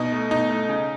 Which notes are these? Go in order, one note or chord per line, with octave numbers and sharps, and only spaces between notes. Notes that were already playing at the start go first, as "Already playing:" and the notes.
Already playing: B2 D#4
A3
B2 D#4
A3
C#3